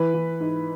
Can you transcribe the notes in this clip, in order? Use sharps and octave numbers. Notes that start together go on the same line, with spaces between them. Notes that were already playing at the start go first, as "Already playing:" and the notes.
Already playing: E3 B4
E3
G#2